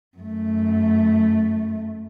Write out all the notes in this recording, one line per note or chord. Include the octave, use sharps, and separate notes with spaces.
F#2 A3